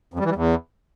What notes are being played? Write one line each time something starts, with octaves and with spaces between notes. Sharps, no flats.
F2
G3
E3
G3
E2